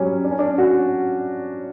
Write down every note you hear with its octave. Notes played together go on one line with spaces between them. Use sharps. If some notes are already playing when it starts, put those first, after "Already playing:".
Already playing: F#3 G3 C#4
D4
C#4
D4
F#4